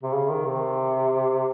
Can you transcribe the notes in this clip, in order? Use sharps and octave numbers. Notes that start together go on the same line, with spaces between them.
C3
C#3
D#3
C3